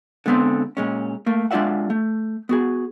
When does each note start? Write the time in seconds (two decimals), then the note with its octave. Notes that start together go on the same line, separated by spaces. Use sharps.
0.26 D3 G#3 B3 C4 C6
0.77 A#2 G#3 C#4
1.26 A3 A#3
1.51 G#3 D4 F4 D5 E5 F#5
1.90 A3
2.49 B3 F#4 G#4